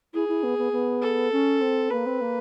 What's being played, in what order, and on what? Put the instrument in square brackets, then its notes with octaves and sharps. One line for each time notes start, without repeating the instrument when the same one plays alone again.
[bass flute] E4 [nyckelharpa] G#4
[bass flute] E4
B3
B3
B3
[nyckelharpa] A4
[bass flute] C#4
C4
[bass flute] A#3 [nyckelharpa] B4
[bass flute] C4
A#3